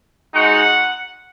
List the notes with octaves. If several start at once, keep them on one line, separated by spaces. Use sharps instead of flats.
G#3 D#4 F#4 F#5